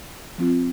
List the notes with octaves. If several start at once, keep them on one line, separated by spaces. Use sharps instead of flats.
F3 C4 F4